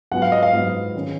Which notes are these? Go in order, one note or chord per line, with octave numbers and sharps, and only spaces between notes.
G#2 F#3 B3 F4 F#5
F5
D#5
F5
G#2 F#3 B3 F4
D#3 G#3 C#4